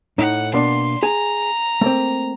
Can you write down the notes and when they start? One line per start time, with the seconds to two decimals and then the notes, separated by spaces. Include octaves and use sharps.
0.18 A2 D#4 F#5
0.54 B2 A#3 D4 C6
1.03 G#4 G#5 A#5
1.81 A3 A#3 C4